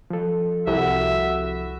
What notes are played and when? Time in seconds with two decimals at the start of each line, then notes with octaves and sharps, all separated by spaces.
0.10 F3 A4
0.67 C2 E4 F#4 E5